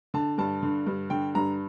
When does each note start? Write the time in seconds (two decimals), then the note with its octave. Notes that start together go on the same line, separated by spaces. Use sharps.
0.14 D3 A5
0.38 G2 A5
0.63 D3
0.87 G2
1.10 D3 G5
1.35 G2 A#5